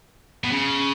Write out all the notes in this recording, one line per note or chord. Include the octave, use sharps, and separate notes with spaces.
B2
C#3